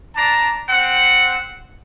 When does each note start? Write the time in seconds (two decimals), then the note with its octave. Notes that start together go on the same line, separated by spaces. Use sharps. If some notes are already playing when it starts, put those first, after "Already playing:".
0.15 D4 D5 A5 A#5
0.69 C4 F#5